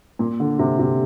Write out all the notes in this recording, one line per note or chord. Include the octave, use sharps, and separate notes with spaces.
A#2
D3
C3
C3